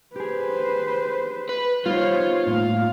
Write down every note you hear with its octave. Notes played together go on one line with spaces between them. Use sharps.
G4 G#4 B4 C5
B4
G3 B3 D#4 F4 C5 C#5
A2 A#3 F5